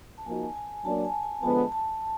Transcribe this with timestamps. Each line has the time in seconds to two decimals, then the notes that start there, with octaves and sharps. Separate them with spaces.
0.18 A5
0.26 F3 A#3 D#4 F#4 G#5
0.56 G#5
0.85 F#3 A#3 D4 A5
1.04 G#5
1.23 G#5
1.43 D3 F3 G#3 B3 A5
1.72 A5